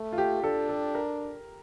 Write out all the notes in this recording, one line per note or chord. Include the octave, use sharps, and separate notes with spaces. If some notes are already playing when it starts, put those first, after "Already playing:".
Already playing: A3
F4
G4
D4 A4
A4
A#4